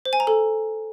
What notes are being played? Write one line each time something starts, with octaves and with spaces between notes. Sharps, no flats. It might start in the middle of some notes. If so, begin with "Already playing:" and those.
C5
G#5
A#5
A4